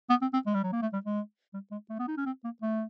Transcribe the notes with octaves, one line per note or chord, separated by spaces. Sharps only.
B3
C4
C4
G#3
G3
F#3
A#3
A3
G3
G#3
G3
G#3
A3
B3
D#4
C#4
C4
A#3
A3